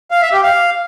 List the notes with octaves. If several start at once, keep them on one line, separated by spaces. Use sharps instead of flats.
F5
E5
G4
F5